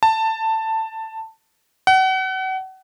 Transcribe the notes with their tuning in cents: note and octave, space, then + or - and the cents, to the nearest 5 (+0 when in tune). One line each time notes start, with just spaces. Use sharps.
A5 +15
F#5 +35